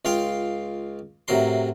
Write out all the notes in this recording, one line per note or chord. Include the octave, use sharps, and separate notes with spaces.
C#2 F4 F5 G5 C6
A2 C3 F#3 A#4 C6